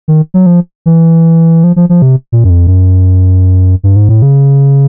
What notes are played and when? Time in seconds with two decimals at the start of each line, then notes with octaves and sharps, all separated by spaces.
0.08 D#3
0.34 F#3
0.46 F3
0.86 E3
1.64 F3
1.76 F3
1.89 F3
2.02 C3
2.32 A#2
2.44 F#2
2.50 F2
2.67 F#2
3.83 G2
3.96 G#2
4.09 A2
4.22 C#3